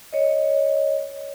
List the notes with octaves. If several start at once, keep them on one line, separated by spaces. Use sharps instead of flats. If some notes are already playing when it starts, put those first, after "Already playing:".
C#5 D#5